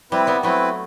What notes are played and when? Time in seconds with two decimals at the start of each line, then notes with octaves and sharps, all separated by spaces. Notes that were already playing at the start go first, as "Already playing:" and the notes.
0.12 G3 C4 E4 B4
0.27 G3 B3
0.43 F#3 A3 C4 E4 B4